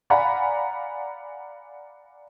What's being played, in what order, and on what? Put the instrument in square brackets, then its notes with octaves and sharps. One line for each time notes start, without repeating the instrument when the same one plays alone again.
[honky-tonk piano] D5 F5 F#5 G#5 A#5 B5